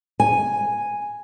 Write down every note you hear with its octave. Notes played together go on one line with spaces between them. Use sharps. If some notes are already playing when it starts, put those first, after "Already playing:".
G#5